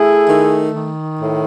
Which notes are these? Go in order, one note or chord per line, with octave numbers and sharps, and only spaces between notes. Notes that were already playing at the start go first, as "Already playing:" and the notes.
Already playing: A3 E4 G#4
D#3
D#3
A2